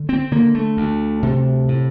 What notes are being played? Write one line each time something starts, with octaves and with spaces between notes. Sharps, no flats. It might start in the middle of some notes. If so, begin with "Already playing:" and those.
Already playing: D3
C4
D3 A#3
A3
D2
C3
A2